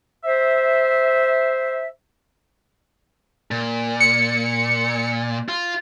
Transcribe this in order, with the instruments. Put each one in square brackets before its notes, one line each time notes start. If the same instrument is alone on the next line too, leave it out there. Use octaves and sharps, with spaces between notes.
[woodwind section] C5 E5
[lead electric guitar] A#2
[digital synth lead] C#7
[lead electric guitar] F4